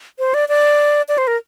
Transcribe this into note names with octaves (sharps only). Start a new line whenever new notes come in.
C5
D5
D5
D5
C5
A#4